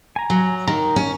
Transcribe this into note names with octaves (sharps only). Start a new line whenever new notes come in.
G#5 A#5
F#3
D#3 A#5
C#4